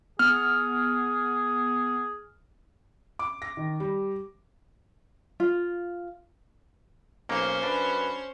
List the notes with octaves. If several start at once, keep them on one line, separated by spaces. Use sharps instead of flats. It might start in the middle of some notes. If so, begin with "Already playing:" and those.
B3 G#4 F6
D6
A#6
D#3
G3
F4
B1 A#3 C#4 C5
F#2 D4 B4